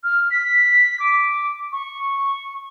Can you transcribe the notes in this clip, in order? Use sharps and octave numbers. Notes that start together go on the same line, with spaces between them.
F6
B6
D6
C#6